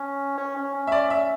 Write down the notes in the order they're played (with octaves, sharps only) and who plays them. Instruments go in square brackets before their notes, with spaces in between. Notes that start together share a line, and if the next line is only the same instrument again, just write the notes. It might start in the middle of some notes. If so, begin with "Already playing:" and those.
Already playing: [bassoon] C#4
C#4
C#4
C#4
[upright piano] E5
D5
E5